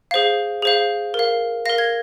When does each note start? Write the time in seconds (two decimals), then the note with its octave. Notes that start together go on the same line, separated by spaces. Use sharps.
0.11 G#4 C5 F5
0.62 G#4 C5 F5
1.14 A#4
1.19 F5
1.66 A#4 F5 A#6
1.78 G#6